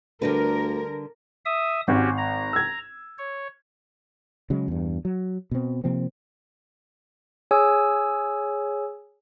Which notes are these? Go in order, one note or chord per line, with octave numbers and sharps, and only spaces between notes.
D2 D3 G3 A#4 B4
E5 D#6
G#1 C#4 F#4 G4
A#5
E6 G#6
C#5
C#3 F#3 G#3
E2 G2
F#3
B2 C4
C3 F3 A#3 C4
G#4 C#5 G#5 D#6 E6